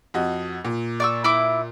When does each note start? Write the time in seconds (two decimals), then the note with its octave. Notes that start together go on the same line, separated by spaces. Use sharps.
0.14 F2 F#4 D#5
0.65 A#2
1.00 D5 C#6 E6
1.24 E4 D6